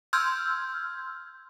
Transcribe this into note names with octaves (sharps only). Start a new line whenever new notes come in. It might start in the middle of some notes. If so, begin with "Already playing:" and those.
C6 E6 F6 G6 G#6